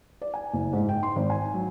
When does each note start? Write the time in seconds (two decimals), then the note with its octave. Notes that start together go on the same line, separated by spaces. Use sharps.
0.22 D5
0.34 G#5
0.53 F#1
0.73 G#2
0.89 G5
1.03 C6
1.16 G#1
1.30 G#5
1.54 F#3